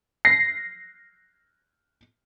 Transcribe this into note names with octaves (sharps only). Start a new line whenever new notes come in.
A#6 C7